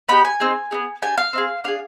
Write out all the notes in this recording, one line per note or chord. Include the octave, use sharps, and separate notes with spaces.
B3 D#4 G4 B5
G#5
C4 D#4 G#4
B3 D#4 G#4
D4 G4 G#5
F5
C4 D#4 G#4
D4 G#4 F5